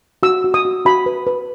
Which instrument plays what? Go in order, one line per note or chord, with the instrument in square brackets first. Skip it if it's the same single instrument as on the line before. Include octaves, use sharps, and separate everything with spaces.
[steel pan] F#4 E6
F#4
D#6
F#4
F#4 B5
B4
B4